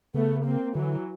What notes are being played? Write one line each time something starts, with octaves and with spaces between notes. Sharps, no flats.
C#3 A3 B3
A#3 C4
D3 E3 F#3